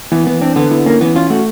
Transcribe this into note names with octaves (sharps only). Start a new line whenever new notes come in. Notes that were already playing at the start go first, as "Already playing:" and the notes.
E3 B3
E3 B3
C4 D4
D3 B3
B3 E4
A#3 C#4
E3 B3
C#4 F4
A3 F#4